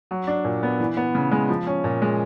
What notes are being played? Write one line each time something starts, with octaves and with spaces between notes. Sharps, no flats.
F#3
D4
A#2
B3
E3
B3
C#3
G#3
F3
C#4
A#2
G#3